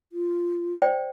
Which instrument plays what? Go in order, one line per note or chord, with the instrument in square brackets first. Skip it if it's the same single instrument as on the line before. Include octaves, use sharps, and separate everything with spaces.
[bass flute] F4
[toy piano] C5 D5 G5